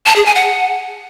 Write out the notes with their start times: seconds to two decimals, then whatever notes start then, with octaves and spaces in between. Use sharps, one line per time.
0.06 A5
0.16 G#4
0.26 G#5
0.35 F#5